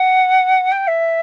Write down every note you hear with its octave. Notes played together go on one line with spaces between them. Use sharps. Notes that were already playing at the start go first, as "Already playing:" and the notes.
Already playing: F#5
G5
E5